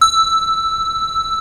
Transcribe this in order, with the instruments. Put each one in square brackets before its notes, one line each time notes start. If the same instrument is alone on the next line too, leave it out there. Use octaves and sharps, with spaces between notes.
[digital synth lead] E6